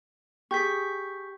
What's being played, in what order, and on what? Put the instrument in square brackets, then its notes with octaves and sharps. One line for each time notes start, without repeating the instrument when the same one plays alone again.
[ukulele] G4 G#4 [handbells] C#6 G6 B6